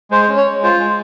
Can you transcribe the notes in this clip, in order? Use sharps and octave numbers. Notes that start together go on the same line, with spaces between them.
G#3 C5
C#4
C#5
G#3
F4 C5
G#3